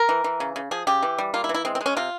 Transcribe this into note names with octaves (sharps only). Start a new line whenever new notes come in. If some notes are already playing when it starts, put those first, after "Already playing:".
Already playing: A#4
E3
E3
C#3
C#3
F3 G#4
C#3 G4
E3
G3
A#3 F4
E4
E3
E4
G#3 C4
C4
G#3
C#4
C3 F4